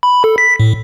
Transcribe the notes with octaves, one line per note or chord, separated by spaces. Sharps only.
B5
A4
B6
A2